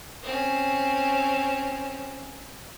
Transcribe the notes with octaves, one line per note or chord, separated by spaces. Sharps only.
C4 C#4